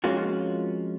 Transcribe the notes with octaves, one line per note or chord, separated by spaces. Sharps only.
F2 G#3 A#3 C#4 F4 F#4